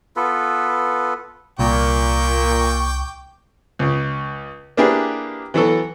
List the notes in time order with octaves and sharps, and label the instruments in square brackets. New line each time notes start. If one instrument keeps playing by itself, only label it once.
[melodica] B3 F4 A4 B4
[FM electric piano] C2 [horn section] A#2 [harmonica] G5 C#6 D6
[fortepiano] C#2 C#3
A#3 D4 E4 G4 G#4 B4
E3 F#3 B3 F#4 A4